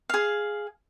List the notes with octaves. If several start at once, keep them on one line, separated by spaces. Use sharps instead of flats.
G#4 F5